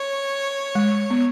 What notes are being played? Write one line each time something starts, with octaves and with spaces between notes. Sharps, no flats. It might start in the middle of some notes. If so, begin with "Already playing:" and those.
Already playing: C#5
G#3
B3